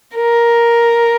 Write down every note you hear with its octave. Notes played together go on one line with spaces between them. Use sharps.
A#4